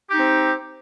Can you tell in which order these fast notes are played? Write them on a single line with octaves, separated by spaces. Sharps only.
G4 D#4 C4